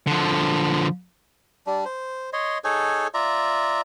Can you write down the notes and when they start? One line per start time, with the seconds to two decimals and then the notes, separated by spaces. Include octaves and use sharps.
0.07 D3 F3
1.67 G3 D4
1.85 C5
2.33 C#5 D#5 C6
2.64 D#4 G#4 A4 C#5
3.14 F4 D5 E5 A#5